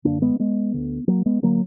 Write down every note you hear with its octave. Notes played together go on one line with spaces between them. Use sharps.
F#2 D3 A#3 D4
G#3 B3
G#3 B3
D2 D3
F#3 A#3
G#3 B3
D3 F#3 A#3